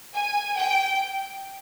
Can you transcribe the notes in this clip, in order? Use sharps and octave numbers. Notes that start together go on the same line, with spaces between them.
G#5
G5